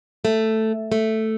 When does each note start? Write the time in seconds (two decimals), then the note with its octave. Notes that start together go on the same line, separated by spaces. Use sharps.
0.25 A3
0.92 A3